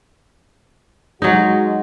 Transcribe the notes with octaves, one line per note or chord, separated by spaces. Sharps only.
F#3 G#3 D#4 F#4